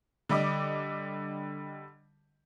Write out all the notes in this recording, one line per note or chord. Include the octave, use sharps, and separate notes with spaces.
D3 G3 D#5 D6